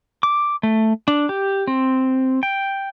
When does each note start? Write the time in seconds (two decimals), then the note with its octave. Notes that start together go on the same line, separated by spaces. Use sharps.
0.23 D6
0.63 A3
1.08 D4
1.29 G4
1.67 C4
2.43 G5